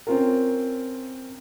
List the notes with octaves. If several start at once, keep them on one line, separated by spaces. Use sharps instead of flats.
C4 C#4 F4 A#4